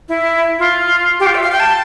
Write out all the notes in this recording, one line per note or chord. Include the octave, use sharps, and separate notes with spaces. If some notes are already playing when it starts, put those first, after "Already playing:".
E4
F4
G4
F4
E5
F5
G5
A5